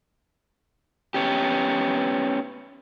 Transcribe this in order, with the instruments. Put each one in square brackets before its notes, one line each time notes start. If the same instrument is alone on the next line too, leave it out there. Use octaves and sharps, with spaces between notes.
[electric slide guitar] B3 C#4 G4